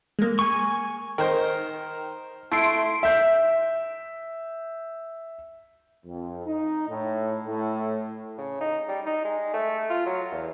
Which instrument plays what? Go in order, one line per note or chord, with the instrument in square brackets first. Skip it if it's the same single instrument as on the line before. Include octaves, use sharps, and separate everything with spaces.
[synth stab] G#3 A#3
[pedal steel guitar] G#5 C#6
[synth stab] D#3 [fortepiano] A#4 C5
[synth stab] A3 C6 D7 [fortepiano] E4
[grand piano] E5 G6
[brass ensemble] F2
D#4
A2
A2
[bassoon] C#3
D#4
G3
D#4
G#3
A3
F4
F#3
E2